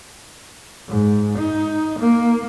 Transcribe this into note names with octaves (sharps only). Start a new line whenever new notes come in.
G#2
D#4
A#3